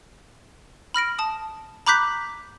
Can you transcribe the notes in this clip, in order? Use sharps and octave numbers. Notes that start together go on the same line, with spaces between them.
B5 F6 A#6 D7
A5 D#6
A#5 B5 D6 F#6 G6 B6